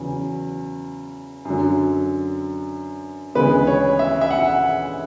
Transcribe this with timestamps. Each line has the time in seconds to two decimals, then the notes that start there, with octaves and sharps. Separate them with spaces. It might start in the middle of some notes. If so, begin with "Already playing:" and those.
Already playing: E2 C#3 F#3
1.45 F#2 D3 F#3
3.35 D2 C#3 E3 G#3 B3 B4
3.67 C#5
3.99 E5
4.21 E5
4.30 F#5